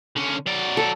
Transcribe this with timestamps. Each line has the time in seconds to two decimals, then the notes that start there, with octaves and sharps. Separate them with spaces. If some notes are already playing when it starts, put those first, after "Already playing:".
0.16 D3 C#4
0.46 F#3 D5
0.77 A4